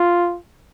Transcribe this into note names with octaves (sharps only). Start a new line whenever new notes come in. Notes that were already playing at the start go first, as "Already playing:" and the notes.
Already playing: F4